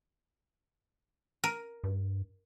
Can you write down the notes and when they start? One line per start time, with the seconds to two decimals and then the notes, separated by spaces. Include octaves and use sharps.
1.44 A#4
1.84 G2